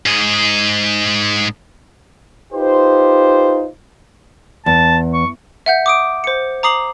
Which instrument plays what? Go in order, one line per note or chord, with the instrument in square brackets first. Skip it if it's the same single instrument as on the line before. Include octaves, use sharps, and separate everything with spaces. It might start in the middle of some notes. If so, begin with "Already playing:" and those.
[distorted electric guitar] G#2 G#4
[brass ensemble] D#4 F4 G4 B4 C5
[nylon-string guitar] E2 [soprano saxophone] A5
[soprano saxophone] C#6
[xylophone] E5 F#5 G6
D6 D#6 D7
C5 C#7
A#5 D6 D#6 C7 F#7